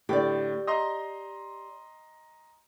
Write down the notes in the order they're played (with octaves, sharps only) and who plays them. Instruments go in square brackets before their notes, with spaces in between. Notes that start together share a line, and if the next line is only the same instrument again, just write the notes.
[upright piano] A2 D3 [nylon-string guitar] G4 D5
[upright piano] D#5 A#5 C6